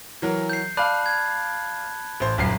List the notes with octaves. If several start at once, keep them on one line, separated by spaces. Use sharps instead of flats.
E3 F#3 A#4
G6 C7
D5 F5 A5 B5 F#6
G#6
A1 C5
D#1 F#2 C7